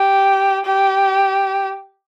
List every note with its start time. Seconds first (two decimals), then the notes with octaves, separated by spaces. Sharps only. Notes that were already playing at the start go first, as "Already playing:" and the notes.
Already playing: G4
0.65 G4